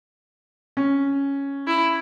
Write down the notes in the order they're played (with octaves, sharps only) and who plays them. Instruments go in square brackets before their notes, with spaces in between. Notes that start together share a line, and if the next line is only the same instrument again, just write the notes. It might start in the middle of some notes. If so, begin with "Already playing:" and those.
[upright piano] C#4
[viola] E4